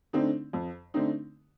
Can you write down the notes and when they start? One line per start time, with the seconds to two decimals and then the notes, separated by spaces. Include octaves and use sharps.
0.13 D3 A3 C4 D#4
0.53 F2
0.94 D3 A3 C4 D#4